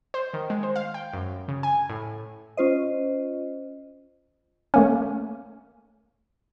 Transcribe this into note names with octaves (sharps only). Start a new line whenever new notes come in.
C5
D#3
G#3
C5
F5
G5
F#2
C#3
G#5
A2
C#4 F4 C5 D#5
A3 A#3 C#4